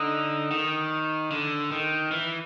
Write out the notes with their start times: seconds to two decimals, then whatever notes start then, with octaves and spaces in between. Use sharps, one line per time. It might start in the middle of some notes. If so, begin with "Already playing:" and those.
Already playing: D3 D#4
0.51 D#3
1.31 D3
1.72 D#3
2.11 E3